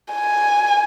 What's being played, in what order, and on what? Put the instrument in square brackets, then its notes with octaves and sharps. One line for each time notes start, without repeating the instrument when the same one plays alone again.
[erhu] G#5